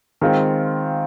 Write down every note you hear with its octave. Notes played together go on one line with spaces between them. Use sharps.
D#3 G#3 C4 F4